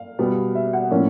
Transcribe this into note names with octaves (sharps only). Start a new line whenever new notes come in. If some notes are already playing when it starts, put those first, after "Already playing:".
Already playing: F5
B2 G3 B3
E5
F#5
A2 F3 A#3 C#4